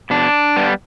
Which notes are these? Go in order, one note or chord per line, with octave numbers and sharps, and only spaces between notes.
B2 D4
G3 B3